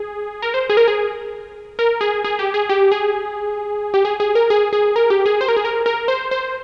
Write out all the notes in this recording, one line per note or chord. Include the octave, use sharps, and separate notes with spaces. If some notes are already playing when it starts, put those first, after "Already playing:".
Already playing: G#4
A#4
C5
G#4
A#4
G#4
A#4
G#4
G#4
G4
G#4
G4
G#4
G4
G#4
G#4
A#4
G#4
G#4
A#4
G4
G#4
C5
A#4
G#4
A#4
A#4
C5
C5